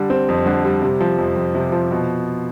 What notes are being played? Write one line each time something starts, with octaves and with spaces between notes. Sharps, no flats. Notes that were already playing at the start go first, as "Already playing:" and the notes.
Already playing: D3 G3
C4
F2
D3
G3
C3
F3
F2
F2
C3
F3
B2